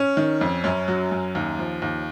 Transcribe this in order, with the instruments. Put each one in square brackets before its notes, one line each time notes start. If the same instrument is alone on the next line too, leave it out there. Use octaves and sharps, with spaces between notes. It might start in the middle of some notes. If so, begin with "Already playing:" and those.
Already playing: [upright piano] C#4
D#3
F2
F#2 C#4
F#3
F#2
D#2
F3
D#2